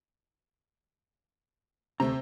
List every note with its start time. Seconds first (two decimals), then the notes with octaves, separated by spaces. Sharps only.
2.00 D2 C3 A3 A#5